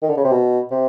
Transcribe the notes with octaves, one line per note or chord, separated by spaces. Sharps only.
D#3
D3
C#3
C3
B2
C3